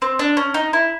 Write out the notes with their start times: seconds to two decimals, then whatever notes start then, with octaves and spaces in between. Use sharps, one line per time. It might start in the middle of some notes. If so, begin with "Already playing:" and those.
0.02 C4
0.19 D4
0.37 C#4
0.54 D#4
0.73 E4